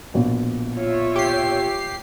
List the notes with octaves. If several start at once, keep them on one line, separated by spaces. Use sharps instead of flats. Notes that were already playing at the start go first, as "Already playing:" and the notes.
A#1 B2
F4 C#5 E5
G4 C7